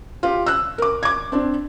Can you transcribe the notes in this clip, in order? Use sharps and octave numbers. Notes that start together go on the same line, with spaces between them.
F4 G4
E6 F#6
A#4 D6
D6 G#6
C4 D4